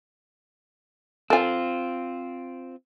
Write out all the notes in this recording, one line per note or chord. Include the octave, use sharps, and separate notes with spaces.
C4 F4 A4 G#5